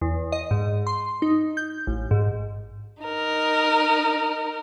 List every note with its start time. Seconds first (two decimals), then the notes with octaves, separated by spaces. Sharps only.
0.01 E2
0.32 D#5
0.51 G#2
0.87 C6
1.22 D#4
1.57 G6
1.87 A1
2.11 G#2
3.02 D#4 A#4